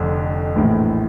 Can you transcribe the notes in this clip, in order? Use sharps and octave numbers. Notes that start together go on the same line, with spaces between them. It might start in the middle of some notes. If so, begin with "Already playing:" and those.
Already playing: F1 F2 D3
A#1 A2 E3